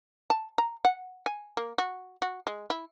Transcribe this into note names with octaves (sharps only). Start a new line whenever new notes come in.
A5
A#5
F#5
G#5
A#3
F#4
F#4
G#3
E4